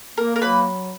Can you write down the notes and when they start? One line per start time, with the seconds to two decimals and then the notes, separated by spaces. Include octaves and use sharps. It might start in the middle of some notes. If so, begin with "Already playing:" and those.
0.18 A#3 A#4
0.36 A#4
0.42 F#3 B4